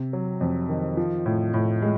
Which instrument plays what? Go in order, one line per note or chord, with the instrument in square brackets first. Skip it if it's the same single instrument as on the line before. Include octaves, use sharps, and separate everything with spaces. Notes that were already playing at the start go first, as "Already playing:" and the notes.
Already playing: [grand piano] C3
F#3
F2
D#3
F3
A2
A2
G#3